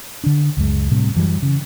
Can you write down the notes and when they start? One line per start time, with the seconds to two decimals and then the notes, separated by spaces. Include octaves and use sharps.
0.24 D3 D4
0.57 C#2 F#2 G#3
0.91 A2 C3 G3
1.16 F#2 E3 F#3 G3
1.42 C#3